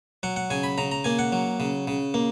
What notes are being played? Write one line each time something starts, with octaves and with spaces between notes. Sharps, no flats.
F#3 F#5
F#5
C#3 G#5
B5
C#3 A#5
A#5
A#3 G#5
F#5
F#3
C#3
C#3
A#3